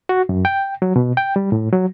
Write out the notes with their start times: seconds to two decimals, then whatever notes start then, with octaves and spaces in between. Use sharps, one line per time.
0.09 F#4
0.29 F#2
0.45 G5
0.82 F#3
0.96 B2
1.17 G5
1.36 G3
1.52 A2
1.73 F#3